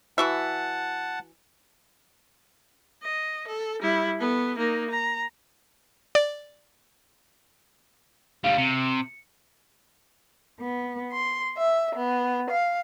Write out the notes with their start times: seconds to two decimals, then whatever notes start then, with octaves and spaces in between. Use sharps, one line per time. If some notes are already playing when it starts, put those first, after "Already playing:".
0.18 E3 F#4 E5 F#5 A5
3.02 D#5
3.47 A4
3.81 G3 E4
4.19 B3 A4
4.58 A#3 D#4
4.90 A#5
6.15 D5
8.44 D2 G3 F5
8.58 C3 C#7
10.60 B3
11.13 C6
11.58 E5
11.96 B3
12.51 F5